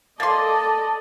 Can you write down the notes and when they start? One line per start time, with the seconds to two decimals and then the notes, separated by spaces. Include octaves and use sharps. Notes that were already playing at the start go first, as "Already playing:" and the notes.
0.20 A#3 A4 D5 D#5 A5 C6 D6 A6